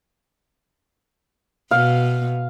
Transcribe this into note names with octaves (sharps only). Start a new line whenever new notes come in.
B2 F5